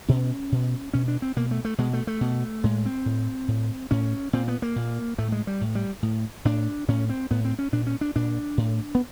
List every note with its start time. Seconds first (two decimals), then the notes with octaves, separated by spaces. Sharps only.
0.08 B2 C#4
0.52 B2
0.93 B2 C#4
1.08 D4
1.22 C4
1.36 B2 A#3
1.51 A3
1.65 A3
1.78 B2 G#3
1.93 A3
2.07 A3
2.21 B2
2.64 A2 G#3
2.85 C4
3.06 A2
3.48 A2
3.91 A2 C#4
4.33 A#2 C4
4.48 B3
4.62 A#3
4.76 A#2
5.18 A2 A3
5.32 G#3
5.47 G3
5.61 A2
5.75 G3
6.03 A2
6.45 A2 D4
6.88 A2 C#4
7.09 C4
7.31 A2 B3
7.45 C4
7.59 C#4
7.72 A#2 D4
7.87 C#4
8.01 D4
8.16 A#2 D4
8.58 A2
8.95 B3